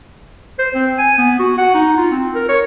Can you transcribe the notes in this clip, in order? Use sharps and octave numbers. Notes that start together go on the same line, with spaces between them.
C5
C4
G#5
B3
F#4
F#5
D#4
F4
C4
A#4
C#5